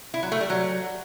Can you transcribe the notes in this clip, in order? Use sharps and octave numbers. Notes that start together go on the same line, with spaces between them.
E4
F#3
A3
G3
F#3